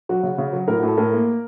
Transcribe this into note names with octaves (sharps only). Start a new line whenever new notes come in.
F#3 F#4
C#3
C#3
F#3
A2 A#4
F#4
A2 A4
A2 A#4
A#3